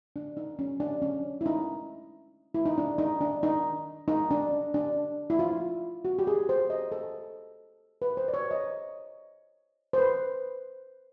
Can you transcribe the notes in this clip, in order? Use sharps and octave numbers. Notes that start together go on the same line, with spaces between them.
D4
D#4
C#4
D4
C#4
E4
D#4
E4
D#4
D4
D#4
D4
D#4
D#4
D4
D4
E4
F4
F#4
G4
G#4
C5
D#5
A4
B4
C5
D5
C#5
D#5
C5
B4